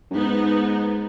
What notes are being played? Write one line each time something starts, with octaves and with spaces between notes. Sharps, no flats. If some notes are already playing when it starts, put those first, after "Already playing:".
F#2
G#2 B3 D#4